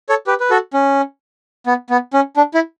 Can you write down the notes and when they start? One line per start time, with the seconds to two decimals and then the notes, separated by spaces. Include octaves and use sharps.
0.09 A4 C#5
0.27 G4 B4
0.40 B4
0.50 F#4 A4
0.74 C#4
1.67 B3
1.90 B3
2.13 C#4
2.37 D4
2.54 E4